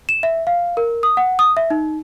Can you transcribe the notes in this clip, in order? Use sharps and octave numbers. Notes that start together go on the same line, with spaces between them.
E7
E5
F5
A#4
D#6
F#5
D#6
E5
D#4